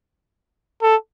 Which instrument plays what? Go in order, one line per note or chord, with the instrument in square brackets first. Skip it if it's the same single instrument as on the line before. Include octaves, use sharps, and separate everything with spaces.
[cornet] A4